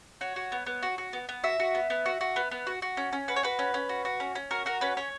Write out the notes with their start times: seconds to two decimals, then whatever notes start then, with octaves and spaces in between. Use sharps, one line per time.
0.21 F#4 C#5
0.36 F#4
0.52 B3
0.66 B3
0.83 F#4
0.98 F#4
1.13 B3
1.29 B3
1.44 F#4 E5
1.60 F#4
1.75 B3
1.90 B3
2.06 F#4
2.21 F#4
2.36 B3
2.51 B3
2.67 F#4
2.82 F#4
2.97 C#4
3.13 C#4
3.28 F#4 B4
3.36 C#5
3.43 F#4 B4
3.59 C#4
3.74 C#4
3.89 F#4
4.05 F#4
4.20 C#4
4.35 C#4
4.51 F#4 A#4
4.66 F#4 A#4
4.81 C#4 B4
4.97 C#4 C#5